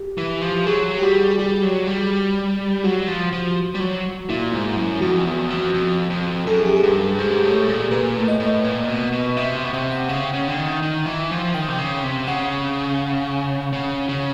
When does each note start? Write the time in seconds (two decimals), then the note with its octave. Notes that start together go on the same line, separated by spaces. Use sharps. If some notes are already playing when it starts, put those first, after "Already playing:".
Already playing: G4
0.18 E3
0.41 F3
0.66 F#3 G#4
0.98 G4
1.02 G3 F#4
1.31 G#4
1.39 G3 G4
1.63 F#3
1.87 G3
2.84 F#3 F#4
3.07 F3
3.32 F3
3.75 G3
3.80 F#3
4.29 A#2 E4
4.53 G#2
4.77 F#2
5.01 F2 F#4
5.25 E2
5.50 F2
5.74 F2
6.10 F2
6.46 F#2 A4
6.56 G#4
6.66 G4
6.76 G#4
6.83 G2
7.19 G#2
7.44 A2
7.68 A#2
7.91 A#2 B4
8.16 A2
8.28 D#5
8.40 A2
8.64 A#2
8.89 B2
9.12 B2
9.37 C3 E5
9.64 B2
9.73 C3 G5
9.92 F#5
10.09 C#3 G5
10.34 C#3
10.48 D3
10.57 D#3
10.82 D#3
11.06 E3
11.31 F3
11.54 D#3 G5
11.68 C3
11.78 C#3
12.03 C3
12.27 C#3 F#5
13.73 C#3
14.09 C#3